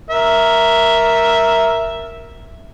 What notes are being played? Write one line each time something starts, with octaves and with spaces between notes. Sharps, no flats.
A#4 E5